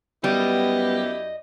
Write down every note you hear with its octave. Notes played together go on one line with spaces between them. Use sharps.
F#2 G3 B3 E4 G4 D#5